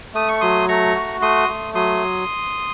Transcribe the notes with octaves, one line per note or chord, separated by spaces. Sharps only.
A3 D#6
C#6
F#3 C6 D#6
A3 A#5 C#6
F#4
A3 C6 D#6
A3
F#3 C6 D#6